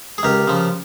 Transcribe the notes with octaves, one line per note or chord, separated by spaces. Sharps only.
G#4
C#2 G4 A#4
C#3 F3